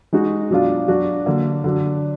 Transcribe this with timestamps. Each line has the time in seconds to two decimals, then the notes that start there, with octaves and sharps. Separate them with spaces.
0.13 G#3 D#4 F#4
0.50 B2 F#3 D4 F4
0.88 F#3 D4 F#4
1.26 D3 F#3 A#3
1.64 D3 F#3 D4